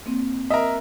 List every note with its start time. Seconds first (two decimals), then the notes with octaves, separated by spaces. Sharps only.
0.06 A#3 C4
0.50 A#4 D#5 E5